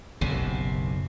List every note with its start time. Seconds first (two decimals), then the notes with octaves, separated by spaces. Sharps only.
0.21 F#1 B1 C3